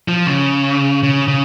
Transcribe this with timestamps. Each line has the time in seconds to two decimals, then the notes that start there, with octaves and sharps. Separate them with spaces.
0.08 F3
0.27 C#3
1.03 C#3
1.28 C#3